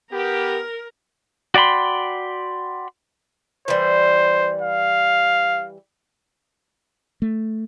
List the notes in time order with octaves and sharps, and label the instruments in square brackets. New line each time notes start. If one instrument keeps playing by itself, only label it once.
[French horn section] B3 G4 [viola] A#4
[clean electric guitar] F#4 D5 G5 B5 C6
[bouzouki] E3 G3 [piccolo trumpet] C5
[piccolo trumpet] F5
[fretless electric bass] A3